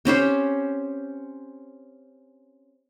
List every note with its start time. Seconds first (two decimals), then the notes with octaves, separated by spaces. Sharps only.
0.05 C4 C#4 G4 C5